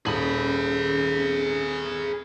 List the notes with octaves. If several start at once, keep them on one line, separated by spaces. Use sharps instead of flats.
D#1 C#4 G#4 B5 F#7